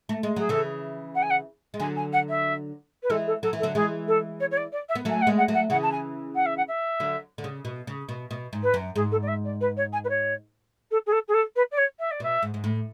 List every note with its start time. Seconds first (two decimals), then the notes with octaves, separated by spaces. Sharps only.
0.09 A3
0.23 G#3
0.36 F#3 G#4
0.49 C#3 E3 A4
1.15 F#5
1.22 G#5
1.30 F#5
1.74 G#3
1.80 D3 F#3 G#5
1.96 G#5
2.13 F#5
2.29 E5
3.03 B4
3.10 E3 G#3 A4
3.27 A4
3.42 F#3 A4
3.53 E3
3.59 A4
3.63 D3 F#3
3.74 E3 G#3 G#4
4.07 A4
4.40 C#5
4.51 C#5
4.57 D5
4.72 D5
4.89 E5
4.95 B3
5.05 F#3 A3 G#5
5.21 F#5
5.27 G#3 B3
5.37 F#5
5.48 F#3 A3
5.54 F#5
5.70 C#3 E3 F#5
5.82 A5
5.92 G#5
6.35 F#5
6.45 E5
6.57 F#5
6.68 E5
7.00 D3 F#3
7.38 D3
7.44 C#3
7.65 B2
7.87 C#3
8.09 B2
8.31 B2
8.53 G#2
8.63 B4
8.74 F#2
8.95 G#2 G#4
9.11 A4
9.22 D5
9.27 E5
9.44 D5
9.60 B4
9.76 C#5
9.92 G#5
10.04 B4
10.09 C#5
10.91 A4
11.06 G#4
11.12 A4
11.28 G#4
11.34 A4
11.56 B4
11.71 D5
11.77 C#5
11.99 E5
12.11 D5
12.20 B2 E5
12.43 G#2
12.54 G#2
12.64 A2